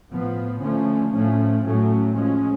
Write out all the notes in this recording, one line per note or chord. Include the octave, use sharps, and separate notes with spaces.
A2 F3 B3
D3 F3 A3 C#4
A2 F3 A3 C#4
A2 F#3 A3 C#4
F3 G#3 C#4